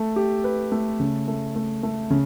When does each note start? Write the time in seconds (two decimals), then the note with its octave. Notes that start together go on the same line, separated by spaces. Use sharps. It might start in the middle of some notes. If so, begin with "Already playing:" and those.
Already playing: A3 A4
0.16 G4
0.44 B4
0.72 A3
1.00 C#3
1.28 A3
1.56 A3
1.83 A3
2.10 C#3